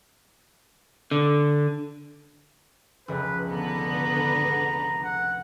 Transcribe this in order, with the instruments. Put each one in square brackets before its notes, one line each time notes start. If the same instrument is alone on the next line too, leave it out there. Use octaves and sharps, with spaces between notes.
[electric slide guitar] D3
[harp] F1 C#2 [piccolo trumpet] B4
[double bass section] G#1 D3 [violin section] B3 B4 [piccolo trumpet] A#5
[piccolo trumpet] F#5